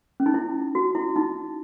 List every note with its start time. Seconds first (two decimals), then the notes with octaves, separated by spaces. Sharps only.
0.20 C#4
0.26 D#4
0.34 E4
0.75 F#4
0.95 E4
1.16 D#4